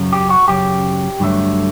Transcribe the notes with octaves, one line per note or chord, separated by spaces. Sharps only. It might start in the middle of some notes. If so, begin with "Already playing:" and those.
Already playing: F#2 C#3 F#3
G4
F#4
F#2 C#3 F#3 G4
G2 D3 F#3 A3